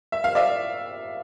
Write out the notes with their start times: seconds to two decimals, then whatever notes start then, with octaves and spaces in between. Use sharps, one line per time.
0.12 E5
0.24 F5
0.35 D5 E5